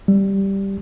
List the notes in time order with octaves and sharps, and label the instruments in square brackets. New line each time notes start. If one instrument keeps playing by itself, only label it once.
[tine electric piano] G3